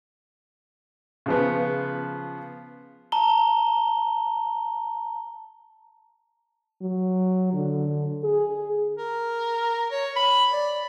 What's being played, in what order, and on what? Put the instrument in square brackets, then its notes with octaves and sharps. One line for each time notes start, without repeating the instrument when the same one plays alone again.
[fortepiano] C#3 F3 B3
[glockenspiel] A5 A#5 G7
[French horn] F#3
D3
G#4
[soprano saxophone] A#4
C#5
B5
D5